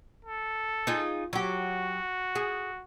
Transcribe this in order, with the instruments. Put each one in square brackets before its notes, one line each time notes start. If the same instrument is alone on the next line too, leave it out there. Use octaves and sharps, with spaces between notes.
[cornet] A4
[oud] D#4 F4 G#4
[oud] F#3 G4 [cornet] F#4
[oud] G#4